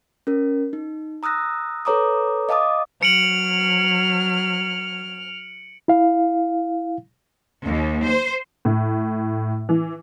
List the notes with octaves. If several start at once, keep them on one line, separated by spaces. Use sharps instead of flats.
C#4 A#4
D#4
A#5 D#6 E6 F#6 A#6
A4 B4 C#5 A#5 D6 D#6
D#5 F5 A5 D6 D#6
F#3 F6 C#7 D7 F#7
E4 F5
D#2
C5
A2
E3